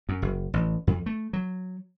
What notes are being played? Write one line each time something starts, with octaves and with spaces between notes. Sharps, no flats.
F#2
F#1
A1
F2
A3
F#3